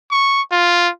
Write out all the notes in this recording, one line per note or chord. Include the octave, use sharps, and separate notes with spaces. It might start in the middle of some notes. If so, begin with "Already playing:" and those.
C#6
F4